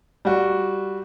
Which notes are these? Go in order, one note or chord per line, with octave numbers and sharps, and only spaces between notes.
G3 F#4